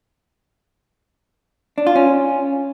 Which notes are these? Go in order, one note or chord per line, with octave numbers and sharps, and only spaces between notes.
D4
F4
C#4